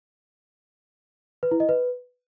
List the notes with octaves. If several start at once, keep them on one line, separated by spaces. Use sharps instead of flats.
B4
E4
D#5
B4